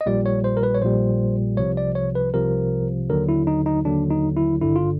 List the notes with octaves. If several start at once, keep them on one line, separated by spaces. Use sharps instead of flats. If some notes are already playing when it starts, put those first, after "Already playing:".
D#5
A#1 A#2 G3 D5
C#5
C5
A#4
B4
C#5
A#1 A#2 G3 C5
C2 C3 F3 C#5
D5
C#5
B4
C2 C3 F3 A#4
D#2 D3 F#3 A#4
E4
D#4
D#4
D#2 D3 F#3 D4
D#4
E4
G#1 G2 D3 E4
F4